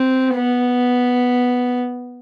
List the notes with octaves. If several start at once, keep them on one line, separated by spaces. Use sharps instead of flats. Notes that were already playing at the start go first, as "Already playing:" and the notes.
Already playing: C4
B3